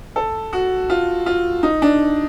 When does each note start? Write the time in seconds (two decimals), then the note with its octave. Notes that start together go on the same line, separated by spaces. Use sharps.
0.16 A4
0.53 F#4
0.90 F4
1.26 F4
1.63 D#4
1.82 D4